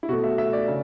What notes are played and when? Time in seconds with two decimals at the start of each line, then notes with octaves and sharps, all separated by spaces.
0.03 E4
0.09 B2 A3 F#4
0.24 E5
0.38 E5
0.53 D5
0.68 C#3